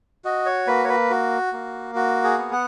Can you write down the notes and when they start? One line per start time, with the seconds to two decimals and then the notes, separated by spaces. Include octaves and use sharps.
0.24 F#4 D#5
0.46 C#5
0.67 A#3 B4
0.84 C#5
0.89 B4
1.10 F#4
1.53 A#3
1.95 F#4
2.24 G#4
2.38 B3
2.52 F#5